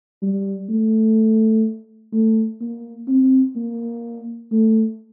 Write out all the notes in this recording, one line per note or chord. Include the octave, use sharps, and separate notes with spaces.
G3
A3
A3
A#3
C4
A#3
A3